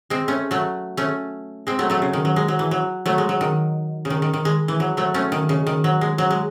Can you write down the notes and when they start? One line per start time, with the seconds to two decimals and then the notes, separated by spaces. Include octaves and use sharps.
0.10 G#3 C4
0.28 A3 C#4
0.51 F#3 A3
0.97 A3 C#4
1.67 G#3 C4
1.79 F#3 A3
1.90 F#3 A3
2.02 C#3
2.13 D#3
2.25 F#3
2.36 G#3
2.48 F#3
2.59 E3
2.71 F#3
3.06 F#3 A3
3.18 G#3
3.29 F#3
3.41 D#3
4.05 C#3
4.10 D#3
4.22 D#3
4.33 D#3
4.45 G#3
4.68 E3
4.80 F#3
4.97 F#3 A3
5.14 A3 C#4
5.32 D#3
5.49 C#3
5.67 D#3
5.84 F#3
6.01 G#3
6.18 F#3
6.31 G#3